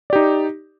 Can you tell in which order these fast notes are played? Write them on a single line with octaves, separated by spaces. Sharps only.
D5 G4 D#4